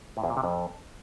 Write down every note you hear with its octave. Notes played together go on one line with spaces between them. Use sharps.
A2
E2
A#2
C3
F2